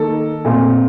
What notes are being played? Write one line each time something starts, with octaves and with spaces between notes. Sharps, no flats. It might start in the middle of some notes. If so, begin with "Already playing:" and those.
Already playing: D#3 A#3 A4
A#2 A3 C4